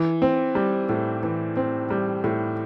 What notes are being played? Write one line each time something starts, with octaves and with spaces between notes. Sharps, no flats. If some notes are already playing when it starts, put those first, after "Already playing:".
Already playing: E3
C4
G3
A2
E3
C4
G3
A2